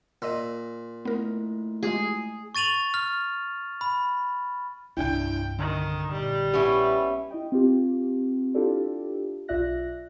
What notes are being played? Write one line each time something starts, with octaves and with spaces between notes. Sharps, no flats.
A#2 D#5 E6
A3 B3 E4 A#4
G#3 F4 G4 G#4
C#6 A6 D#7 F7 F#7
F6
B5
C2 G2 D4 E4 G5
D3 D#3
A#1 G3
B3 C#4 E4 G4
E4 D#5 G5
C4 F4 G4
D4 E4 F4 G4 A4 D5
B1 F4 D5 E5 F#6 A#6